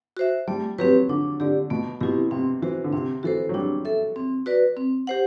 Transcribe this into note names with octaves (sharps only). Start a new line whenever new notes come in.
F#4 C5 E5
G3 A3
F#3 C4 G4 B4
D3 D4
D3 G4 D5
B2 A3
B2 C4 E4 G4
C3 C4
E3 F#4 C5
D3
C3 C4
E3 F#4 A4 C5
F#3
G3 D4
A4 E5
C4
F#4 B4 D5
C4
G4 C5 F#5